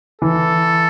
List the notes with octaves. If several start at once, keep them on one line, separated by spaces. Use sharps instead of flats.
E3 A4